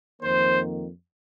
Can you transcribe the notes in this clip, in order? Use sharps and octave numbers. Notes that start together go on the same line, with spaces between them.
F2 D#3 A#3 C5